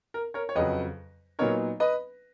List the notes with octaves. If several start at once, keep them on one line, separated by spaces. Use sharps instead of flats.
A#4
A#4 C#5
C#5
F2 C#3 F#3 B4 D#5
A#2 F#3 B3 D#4 A#4 C#5
B4 D#5